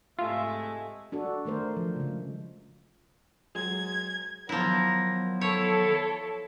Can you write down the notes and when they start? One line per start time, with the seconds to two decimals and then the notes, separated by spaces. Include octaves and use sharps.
0.19 G#2 C3 G#3 A3 F4 E5
1.12 D4 F#4 A4
1.45 D#3 A3 A#4 C5
1.77 F3
1.96 C#3 G#3
3.55 F#3 G#3 G#4 G#6
4.49 D#3 F3 F#3 B3 E4 A#5
5.41 E4 A4 C#5